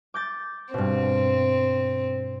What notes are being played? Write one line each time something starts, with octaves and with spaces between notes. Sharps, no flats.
D6 G6 A6
G2 B2 C4